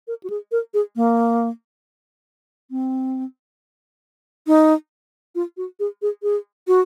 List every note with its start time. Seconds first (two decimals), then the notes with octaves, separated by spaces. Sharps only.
0.08 A#4
0.23 F#4
0.30 G#4
0.52 A#4
0.74 G#4
0.96 A#3
2.71 C4
4.47 D#4
5.35 F4
5.57 F#4
5.80 G#4
6.02 G#4
6.23 G#4
6.68 F#4